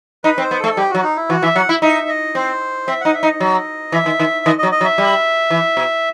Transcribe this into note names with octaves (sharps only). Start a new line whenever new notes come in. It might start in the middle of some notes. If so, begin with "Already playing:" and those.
D#4 B4
C4
C5
B3
A3 A4
G3 G4
F#3 F#4
D#4
E4
E3 F#4
E3 E5
F#3 F#5
E4 E5
D#4 E5
D#5
C4 C5
C4 E5
D#4 F#5
E5
D#4
D#5
F#3
E3 E5
D#3
D#3
D#3 D#5
D#5
F#3
D#5
F#3
E5
G3
E3
B2